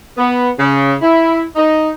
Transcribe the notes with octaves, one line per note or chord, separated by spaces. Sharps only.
B3
C#3
E4
D#4